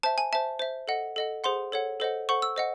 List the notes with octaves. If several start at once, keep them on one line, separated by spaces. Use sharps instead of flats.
C5 E5 A5
G#5
C5 E5 A5
C5 E5
A4 D#5 F#5
A4 D#5 F#5
G#4 C5 F#5 C6
A4 C#5 F#5
A4 C5 D#5 F#5
A4 C5 F#5 C#6
E6
C5 D#5 F#5